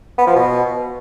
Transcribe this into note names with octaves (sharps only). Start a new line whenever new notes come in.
B3
F3
B2